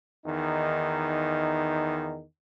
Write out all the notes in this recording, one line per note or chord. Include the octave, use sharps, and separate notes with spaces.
E2 D#3 D#4